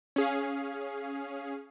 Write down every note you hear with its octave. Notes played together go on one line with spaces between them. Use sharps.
C#4 G#4 F5